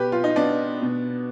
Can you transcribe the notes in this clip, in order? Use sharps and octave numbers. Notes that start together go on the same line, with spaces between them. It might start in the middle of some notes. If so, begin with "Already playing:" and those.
Already playing: B2 G4 B4
F4
D#4
B3 D4
B2